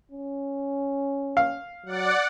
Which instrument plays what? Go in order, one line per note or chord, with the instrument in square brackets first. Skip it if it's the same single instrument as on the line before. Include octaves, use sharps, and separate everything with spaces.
[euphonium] C#4
[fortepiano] F5
[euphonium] F#3 [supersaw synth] D5 F#5